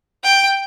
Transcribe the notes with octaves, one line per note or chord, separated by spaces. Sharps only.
G5